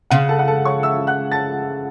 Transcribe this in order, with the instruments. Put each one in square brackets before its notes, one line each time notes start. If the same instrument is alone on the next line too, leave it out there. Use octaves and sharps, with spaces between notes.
[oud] C#3 [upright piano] F#5
[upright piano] A4 A5
F#5
A4 A5
C#5 C#6
E5 E6
F#5 F#6
A5 A6